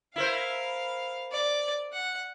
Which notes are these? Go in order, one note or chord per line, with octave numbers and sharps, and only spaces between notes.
E4 A#4 C5 F5
D5
F#5